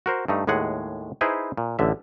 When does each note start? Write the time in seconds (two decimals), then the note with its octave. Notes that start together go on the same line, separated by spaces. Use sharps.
0.06 F#4 A#4 C5
0.28 G2 A3 D#4
0.47 D#2 A2 G#3 G#4 F#5
1.21 D#4 E4 G#4 B4 C5
1.57 A#2
1.79 A1 D3 E5